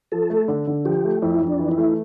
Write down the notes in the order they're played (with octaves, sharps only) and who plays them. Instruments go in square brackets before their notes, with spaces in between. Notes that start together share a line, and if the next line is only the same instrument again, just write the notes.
[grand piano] F3 [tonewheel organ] A4
[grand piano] A3
D3
D3
[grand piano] F3 [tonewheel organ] G4
[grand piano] A3
[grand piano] F2 [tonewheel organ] E4
[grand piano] F2
[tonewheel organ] D4
[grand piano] E3
[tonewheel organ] E4
[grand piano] A3